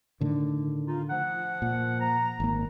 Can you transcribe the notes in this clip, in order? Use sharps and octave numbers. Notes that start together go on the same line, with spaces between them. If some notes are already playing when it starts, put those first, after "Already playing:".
A2 D3 D#3
D#4 F4
F3 F#5
A#2
A#5
G#1 A#3